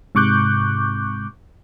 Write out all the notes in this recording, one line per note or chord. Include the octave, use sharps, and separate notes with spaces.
G#2 C3 C#6 D6 F#6 G6